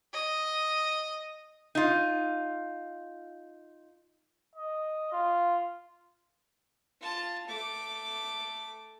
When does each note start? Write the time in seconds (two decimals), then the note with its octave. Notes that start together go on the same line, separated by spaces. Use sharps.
0.13 D#5
1.75 D#4 F4
4.56 D#5
5.12 F4
7.01 F4 A5
7.47 A3 D6